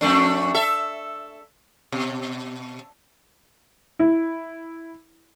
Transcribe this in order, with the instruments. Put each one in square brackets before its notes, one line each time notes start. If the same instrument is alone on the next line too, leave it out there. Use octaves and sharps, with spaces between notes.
[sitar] F2 A3 D4
A4 E5
B2
[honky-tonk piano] E4